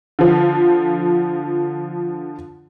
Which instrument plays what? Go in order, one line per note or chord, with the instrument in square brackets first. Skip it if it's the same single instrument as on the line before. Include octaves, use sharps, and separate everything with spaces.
[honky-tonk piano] D3 F3